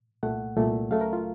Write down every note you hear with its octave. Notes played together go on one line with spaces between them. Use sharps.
C2 A#2 A3 F#5
C2 A#2 A3
C#2 C#3 F#3 A3 F5
A#4
F4